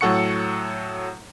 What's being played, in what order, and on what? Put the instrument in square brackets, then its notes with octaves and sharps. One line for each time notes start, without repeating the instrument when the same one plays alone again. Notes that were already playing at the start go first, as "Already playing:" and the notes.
[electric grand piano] A2 F#3 A4 F#5 C#6 C#7